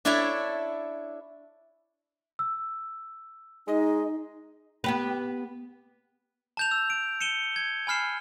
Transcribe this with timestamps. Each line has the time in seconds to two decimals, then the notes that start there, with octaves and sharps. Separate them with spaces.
0.05 D4 E4 A4 C#5 D5 E5
2.39 E6
3.68 G#3 D#4 D#5
4.84 B3 G4 B4
6.57 A5 G6 F7
6.71 E6
6.90 D7
7.21 C#7 D#7 E7 G7
7.56 G#6
7.87 G#5 B5 F6 C7 E7